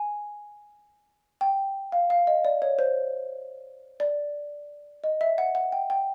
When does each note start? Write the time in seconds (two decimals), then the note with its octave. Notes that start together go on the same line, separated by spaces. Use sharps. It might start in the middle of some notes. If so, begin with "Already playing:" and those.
Already playing: G#5
1.41 G5
1.92 F5
2.10 F5
2.27 D#5
2.45 D5
2.62 C#5
2.79 C5
4.00 D5
5.04 D#5
5.21 E5
5.38 F#5
5.55 F#5
5.72 G5
5.90 G5